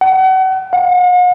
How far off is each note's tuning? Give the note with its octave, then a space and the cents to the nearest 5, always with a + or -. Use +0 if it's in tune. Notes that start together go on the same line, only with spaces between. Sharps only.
F#5 +35
F#5 -45